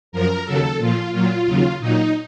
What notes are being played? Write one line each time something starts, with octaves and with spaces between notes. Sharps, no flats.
F#2 F3 A#4
D#2 C#3 F#3 A4
A#2 F3 F4
A#2 F#3 F4
D#2 C#3 F#3
A#2 F#3 D#4